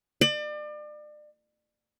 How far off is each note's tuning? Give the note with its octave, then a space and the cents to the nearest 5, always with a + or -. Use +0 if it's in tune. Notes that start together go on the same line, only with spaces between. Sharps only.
D5 +35